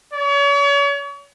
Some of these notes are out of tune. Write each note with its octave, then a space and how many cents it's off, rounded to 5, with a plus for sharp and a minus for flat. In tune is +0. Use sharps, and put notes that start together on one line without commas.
C#5 +40